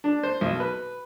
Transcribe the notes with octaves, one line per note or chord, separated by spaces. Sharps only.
D4
C5
B1
B4